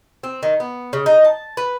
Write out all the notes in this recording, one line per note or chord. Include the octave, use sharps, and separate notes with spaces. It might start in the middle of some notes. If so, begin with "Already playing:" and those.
C4
D#3
B3
C#3
D#4
A5
B4